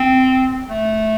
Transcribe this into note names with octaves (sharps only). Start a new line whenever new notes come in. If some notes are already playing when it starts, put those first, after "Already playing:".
Already playing: C4
A3